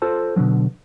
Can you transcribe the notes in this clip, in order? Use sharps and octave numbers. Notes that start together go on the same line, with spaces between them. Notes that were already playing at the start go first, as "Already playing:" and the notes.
F4 A4 C5 A5
B2 D3 F3 F#3